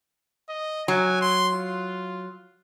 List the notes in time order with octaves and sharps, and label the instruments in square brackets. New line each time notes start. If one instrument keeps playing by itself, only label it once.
[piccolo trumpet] D#5
[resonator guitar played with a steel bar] F#3 [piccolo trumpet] G#5
[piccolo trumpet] C6
F4